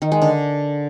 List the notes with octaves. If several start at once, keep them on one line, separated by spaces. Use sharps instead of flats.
D#3
G#3
D3